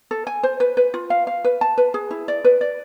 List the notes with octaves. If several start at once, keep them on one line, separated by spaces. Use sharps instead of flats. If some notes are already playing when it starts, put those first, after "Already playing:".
A4
G#5
C5
B4
B4
F4
F5
F5
B4
A5
B4
G#4
E4
D5
B4
D5